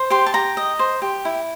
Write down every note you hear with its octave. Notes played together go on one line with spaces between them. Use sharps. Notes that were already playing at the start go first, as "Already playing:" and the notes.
Already playing: C5
G4 C6
A5
G4 A#5
D#5
C5
G4
E4